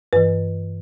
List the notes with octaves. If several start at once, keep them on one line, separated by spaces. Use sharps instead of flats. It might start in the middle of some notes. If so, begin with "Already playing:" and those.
G2 E3 B4